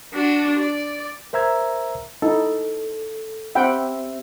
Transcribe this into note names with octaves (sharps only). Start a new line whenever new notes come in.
D4 F#4
D5
A#4 C5 E5 A#5 E6 G#6
D#4 E4 A4
C4 G4 E5 F#5 G5 B5